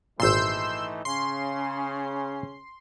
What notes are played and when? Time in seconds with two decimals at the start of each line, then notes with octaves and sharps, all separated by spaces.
0.20 G#1 A#2 E3 A3 D#4 C6 E6 G6
1.05 C#3 C#4 C6